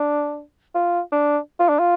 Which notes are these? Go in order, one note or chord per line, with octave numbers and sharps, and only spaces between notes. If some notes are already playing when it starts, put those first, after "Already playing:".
Already playing: D4
F4
D4
F4
D4
F4